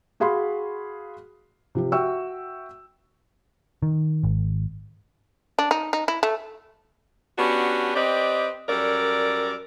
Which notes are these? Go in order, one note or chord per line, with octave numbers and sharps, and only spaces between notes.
F#4 G#4 F5 B5 C6
C3 F3 G4
F#4 E5 G5 C#6 E6
D#3
G#1
D4
D#4
D#4
E4
A3
B3 C#4 D4 F#4 G4
C4 G4 B4 D5 D#5
F#2 G3 A4 A#4 D5